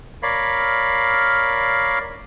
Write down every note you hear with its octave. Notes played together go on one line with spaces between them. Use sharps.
A#4 C#5 D5 F5 B5